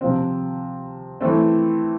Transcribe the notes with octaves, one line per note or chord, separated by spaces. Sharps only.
C3 F3 C4
E3 A3 C4